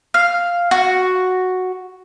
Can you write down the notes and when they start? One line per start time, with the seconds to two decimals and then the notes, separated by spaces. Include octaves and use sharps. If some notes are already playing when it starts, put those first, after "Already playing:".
0.14 F5
0.71 F#4